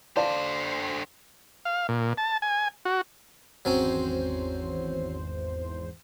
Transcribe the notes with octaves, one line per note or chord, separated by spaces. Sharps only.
D3 C5 D5 F5 A5
F5
A#2
A5
G#5
F#4
G#1 E2 F#3 C4 C#4 C5